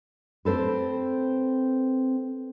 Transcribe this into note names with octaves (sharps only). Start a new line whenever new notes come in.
C4 A4 B4